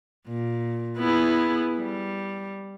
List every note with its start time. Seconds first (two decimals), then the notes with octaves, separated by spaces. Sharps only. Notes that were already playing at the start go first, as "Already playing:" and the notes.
0.28 A#2
0.98 B3 E4 G#4
1.78 G3